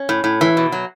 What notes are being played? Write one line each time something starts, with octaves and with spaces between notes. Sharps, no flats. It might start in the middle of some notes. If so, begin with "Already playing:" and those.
Already playing: C#4
A2
A2
E3
B2
F#3